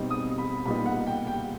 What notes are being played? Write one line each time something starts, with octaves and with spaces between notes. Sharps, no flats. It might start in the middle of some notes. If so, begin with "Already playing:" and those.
Already playing: B2 G3 C4 D#4
D#6
B5
A#2 G3 B3 D#4 B5
F#5
G5
G5